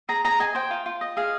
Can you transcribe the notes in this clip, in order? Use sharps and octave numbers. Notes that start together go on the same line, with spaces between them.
G#4 A#5
G#4 A#5
D#5 G#5
C5 G5
F4
F4
D#5
G#4 F5